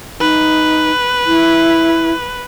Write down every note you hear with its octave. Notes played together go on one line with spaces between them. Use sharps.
D#4 B4
E4